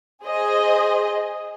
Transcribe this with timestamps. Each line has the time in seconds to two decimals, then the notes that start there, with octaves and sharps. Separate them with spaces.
0.24 G#4 C5 D#5